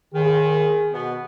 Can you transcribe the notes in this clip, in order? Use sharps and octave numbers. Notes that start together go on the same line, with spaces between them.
D#2 D#3 G#4
B2 B3